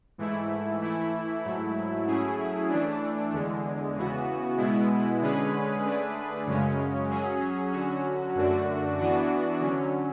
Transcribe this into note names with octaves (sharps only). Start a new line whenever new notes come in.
G#2 E3 A3 E4
E3 A3 E4
G#2 F#3 A3 E4
F#3 A3 C#4 E4 G#4
E3 A3 D4
E2 D3 G#3
C#3 E3 B3 F#4
B2 G#3 B3 E4
D3 G#3 C#4 G#4 B4
D3 A3 D4 G#4 B4
F#2 C#3 G#3 C#4
F#3 C#4 G#4
D3 F#3 C#4 F#4
F#2 D3 A3 D4 F#4
E3 B3 D4 F#4
D3 F#3 C#4